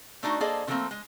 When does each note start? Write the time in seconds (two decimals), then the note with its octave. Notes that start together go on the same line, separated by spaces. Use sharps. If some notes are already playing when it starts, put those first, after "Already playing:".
0.23 A3 D4 D#4 F4 F#4
0.40 A#3 G#4 A4 C5 D5 D#5
0.67 C#3 E3 F3 A3 A#3 C4
0.91 G#3